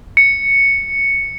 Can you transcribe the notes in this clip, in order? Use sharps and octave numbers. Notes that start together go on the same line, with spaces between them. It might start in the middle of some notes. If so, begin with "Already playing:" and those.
C#7